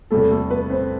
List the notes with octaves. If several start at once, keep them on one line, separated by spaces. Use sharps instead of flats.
E2 C3 G3 A3 A4
A3 A4
B3 B4
C4 C5